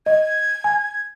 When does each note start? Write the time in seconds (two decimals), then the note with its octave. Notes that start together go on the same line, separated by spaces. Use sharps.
0.06 D#5 G#6
0.64 G#5